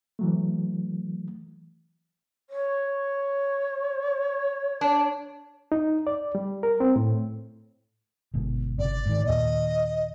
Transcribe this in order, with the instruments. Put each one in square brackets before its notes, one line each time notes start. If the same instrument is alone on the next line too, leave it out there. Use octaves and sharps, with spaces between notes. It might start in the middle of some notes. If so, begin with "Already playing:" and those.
[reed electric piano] E3 F#3 A3
[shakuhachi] C#5
[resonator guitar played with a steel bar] D4
[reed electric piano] D#4
D5
G3
A#4
C4
A2
[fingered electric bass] G1 B2 G#3
[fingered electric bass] G1 C3 [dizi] D5
[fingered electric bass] G#2 D#3
[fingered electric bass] D#2 A#2 [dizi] D#5